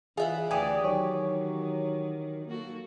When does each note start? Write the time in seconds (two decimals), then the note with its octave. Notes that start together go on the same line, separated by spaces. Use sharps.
0.17 E3 F4 G#4 E5 F#5
0.51 D2 E3 G4 D5 G#5 D#6
0.84 D#3 F#3 C#5
2.48 A#3 F#4 A4